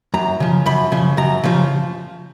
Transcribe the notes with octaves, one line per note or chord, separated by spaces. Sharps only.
F#2 A#5
C#3 F3
F#2 B5
C#3 F3
F#2 A#5
C#3 F3